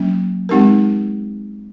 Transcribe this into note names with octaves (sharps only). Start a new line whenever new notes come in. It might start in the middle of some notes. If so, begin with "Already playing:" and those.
Already playing: F#3 A#3 C#4
G#3 C4 D#4 G4 A#4